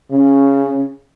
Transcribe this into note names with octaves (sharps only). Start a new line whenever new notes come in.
C#3 C#4